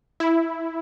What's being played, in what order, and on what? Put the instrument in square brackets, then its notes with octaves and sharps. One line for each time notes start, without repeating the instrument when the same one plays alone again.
[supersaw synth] E4